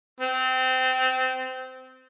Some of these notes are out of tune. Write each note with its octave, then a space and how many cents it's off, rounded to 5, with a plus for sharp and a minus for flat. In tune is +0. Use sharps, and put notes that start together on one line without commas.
C4 -20